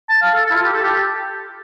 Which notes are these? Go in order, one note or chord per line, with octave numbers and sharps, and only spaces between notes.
A5
F5
A4
A4
E4
F4
G4
A4
G4